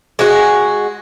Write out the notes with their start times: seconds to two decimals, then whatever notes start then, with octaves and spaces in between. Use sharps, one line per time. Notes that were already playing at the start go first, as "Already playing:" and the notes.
0.19 G#3 F#4